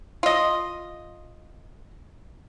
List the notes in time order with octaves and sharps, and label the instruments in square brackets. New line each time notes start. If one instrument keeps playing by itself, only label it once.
[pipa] F4 D#5